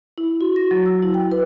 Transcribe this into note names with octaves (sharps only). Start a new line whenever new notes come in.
E4
F#4
A#6
F#3
E6
E4
G5
B4